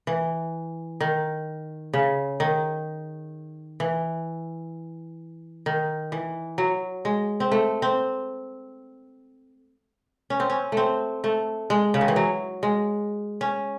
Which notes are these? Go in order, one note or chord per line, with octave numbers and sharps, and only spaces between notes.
E3
D#3
C#3
D#3
E3
D#3
E3
F#3
G#3
C4
A3
C4
C#4
C4
C#4
A3 C4
A3
G#3
C#3
D#3
E3
F#3
G#3
C#4